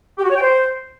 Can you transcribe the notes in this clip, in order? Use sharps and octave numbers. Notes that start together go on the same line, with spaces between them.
G4
F#4
C#5
G5
C5